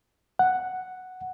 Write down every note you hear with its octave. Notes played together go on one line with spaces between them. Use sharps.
F#5